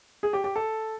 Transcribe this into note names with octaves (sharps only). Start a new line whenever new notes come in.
G#4
G4
G4
A4